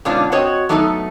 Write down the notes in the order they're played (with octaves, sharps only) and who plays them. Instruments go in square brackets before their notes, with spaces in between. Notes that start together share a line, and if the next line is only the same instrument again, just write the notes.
[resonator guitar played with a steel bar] G#2 B2 D3 C#4 D4 F4
C4 F#4 C#5 D#5
F#3 A3 B3 D#4 G4 A4